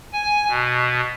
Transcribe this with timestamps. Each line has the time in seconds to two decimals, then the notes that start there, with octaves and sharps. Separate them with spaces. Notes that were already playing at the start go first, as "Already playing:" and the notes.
0.13 G#5
0.48 B2